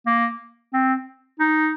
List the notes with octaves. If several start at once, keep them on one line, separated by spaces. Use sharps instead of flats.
A#3
C4
D#4